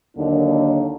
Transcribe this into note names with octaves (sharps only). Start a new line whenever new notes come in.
D#2 D3 F#3 A#3 D#4